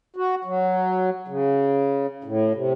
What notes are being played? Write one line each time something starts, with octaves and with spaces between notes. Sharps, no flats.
F#4
F#3
C#3
A2
C3